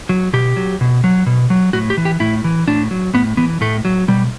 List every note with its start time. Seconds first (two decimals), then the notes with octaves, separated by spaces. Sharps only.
0.09 F#3
0.33 B2 G4
0.57 F#3
0.81 B2
1.04 F#3
1.26 B2
1.50 F#3
1.73 A2 F#4
1.90 G4
1.97 E3
2.05 G4
2.20 A2 E4
2.44 E3
2.68 A2 D4
2.91 F#3
3.14 A2 B3
3.37 E3 B3
3.61 A2 A3
3.85 F#3
4.08 B2 G3